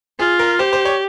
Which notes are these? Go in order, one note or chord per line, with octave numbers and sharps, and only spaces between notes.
F4 G#4
A#4
G4 C5
C5
C#5